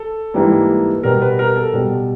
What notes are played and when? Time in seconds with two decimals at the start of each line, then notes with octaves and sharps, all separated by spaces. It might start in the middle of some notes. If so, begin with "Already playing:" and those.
Already playing: A4
0.34 G#2 E3 G3 A#3
1.03 B2 G3 B3 A#4
1.22 B4
1.39 A#4
1.56 A4
1.73 B2 G3 B3